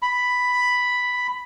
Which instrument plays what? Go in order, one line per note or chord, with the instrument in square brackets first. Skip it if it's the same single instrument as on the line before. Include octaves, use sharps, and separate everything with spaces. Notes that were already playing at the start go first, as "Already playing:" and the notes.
[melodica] B5